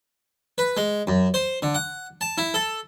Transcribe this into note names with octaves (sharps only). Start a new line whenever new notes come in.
B4
G#3
F#2
C5
D3
F#5
A5
E4
A4